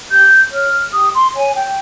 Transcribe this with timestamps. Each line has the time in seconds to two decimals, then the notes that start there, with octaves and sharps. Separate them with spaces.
0.09 G4 G6
0.51 C#5 F6
0.92 G4 D#6
1.13 C6
1.34 C#5 G#5
1.54 G5